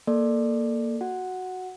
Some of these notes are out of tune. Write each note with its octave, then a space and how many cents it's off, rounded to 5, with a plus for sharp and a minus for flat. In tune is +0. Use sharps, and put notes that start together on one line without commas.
A#3 +0 A4 +0 D5 +20
F#4 +0 F#5 +0